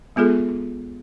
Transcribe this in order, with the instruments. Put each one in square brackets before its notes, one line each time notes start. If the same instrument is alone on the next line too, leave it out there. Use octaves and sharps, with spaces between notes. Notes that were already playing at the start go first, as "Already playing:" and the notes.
[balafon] G#3 B3 F4 G#4 A4